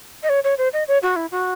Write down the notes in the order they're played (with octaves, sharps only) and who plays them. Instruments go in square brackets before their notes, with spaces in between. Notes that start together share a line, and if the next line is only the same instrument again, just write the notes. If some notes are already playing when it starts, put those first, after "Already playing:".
[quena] D#5
C#5
C#5
C5
D#5
C#5
F#4
E4
F#4